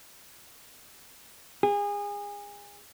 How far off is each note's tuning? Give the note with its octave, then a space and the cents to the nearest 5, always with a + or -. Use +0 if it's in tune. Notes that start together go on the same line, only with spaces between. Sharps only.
G#4 -30